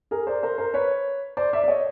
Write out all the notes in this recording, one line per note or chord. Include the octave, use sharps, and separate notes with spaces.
G#4 A#4
C5 D5
A#4 C5
A#4 C5
B4 C#5
C5 D5
D5 E5
D5
C#5 D#5